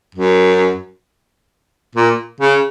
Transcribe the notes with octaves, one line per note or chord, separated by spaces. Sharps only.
F#2
A#2
C#3